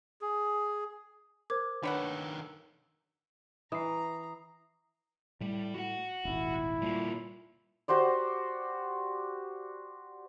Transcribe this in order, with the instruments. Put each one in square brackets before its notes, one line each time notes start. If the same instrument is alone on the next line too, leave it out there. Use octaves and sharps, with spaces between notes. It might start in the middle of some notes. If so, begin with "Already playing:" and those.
[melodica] G#4
[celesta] A#4 C5 [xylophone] D6 G#6
[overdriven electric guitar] D#3 A4 [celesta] D4 [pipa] B4 C#5 F#5
[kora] E3 [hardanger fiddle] A#5 [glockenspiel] D#6 C7
[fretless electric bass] A2 [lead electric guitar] G3
[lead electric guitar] F#4 F#5
[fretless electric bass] D#1 G#1 [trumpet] E4
[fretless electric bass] A#2 [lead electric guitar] G3 F4
[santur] F#4 G4 C5 D5